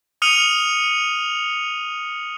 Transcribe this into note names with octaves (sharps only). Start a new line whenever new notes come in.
D#6 F6 C#7 D#7 F7 F#7